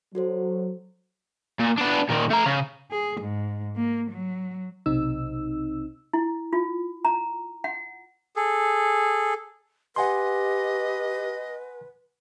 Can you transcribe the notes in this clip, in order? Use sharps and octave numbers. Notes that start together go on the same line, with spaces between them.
F#3 F#4 A4 C5
A#2
B3 D4
A#2 D#3
A3 A#5
C#3
G#4
G#2
A#3
F#3
B1 C3 C4 D#4 E6
E4
F4
A#5
F#5
G#4 A4
G4 B4 D#5 F#5 G#5 C6